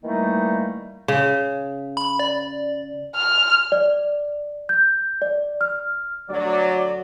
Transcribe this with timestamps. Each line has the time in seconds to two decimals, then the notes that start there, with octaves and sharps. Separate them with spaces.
0.04 D#3 E3 G3 A3 A#3 D#4
1.08 C#3
1.97 B5
2.19 D5
3.15 F6
3.72 D5
4.69 G6
5.22 D5
5.61 F6
6.30 D2 F#3 D5